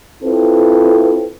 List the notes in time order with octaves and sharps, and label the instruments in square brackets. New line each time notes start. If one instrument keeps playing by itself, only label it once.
[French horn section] C4 E4 F4 A4 B4